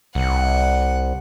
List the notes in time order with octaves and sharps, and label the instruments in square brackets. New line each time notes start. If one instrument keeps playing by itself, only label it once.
[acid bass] C2 [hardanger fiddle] F#5